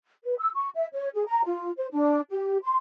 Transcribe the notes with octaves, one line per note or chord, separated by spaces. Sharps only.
B4
E6
C#6
E5
C#5
G#4
A#5
F4
C5
D4
G4
C6